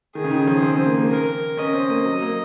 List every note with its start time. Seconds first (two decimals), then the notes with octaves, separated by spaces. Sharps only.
0.15 D#3 G#4
0.24 C#3
0.31 D#3
0.47 F3
0.62 C4
0.75 C4
0.86 A#3
0.98 A#3
1.10 A#4
1.57 C#4 D#5
1.73 C4
1.90 A#3
2.05 F#3
2.22 A#3